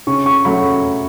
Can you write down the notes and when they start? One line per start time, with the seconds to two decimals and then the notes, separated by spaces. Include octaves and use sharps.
0.07 C#3 C#6
0.26 C#6
0.45 F#3 A3 B5